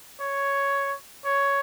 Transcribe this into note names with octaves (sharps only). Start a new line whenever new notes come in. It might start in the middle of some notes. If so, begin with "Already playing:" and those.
C#5
C#5